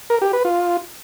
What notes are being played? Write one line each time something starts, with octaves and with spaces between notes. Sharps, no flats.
A#4
G4
B4
F4